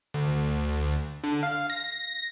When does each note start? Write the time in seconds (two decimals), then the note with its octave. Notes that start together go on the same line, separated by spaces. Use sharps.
0.14 D2
1.24 D3
1.43 F5
1.70 A#6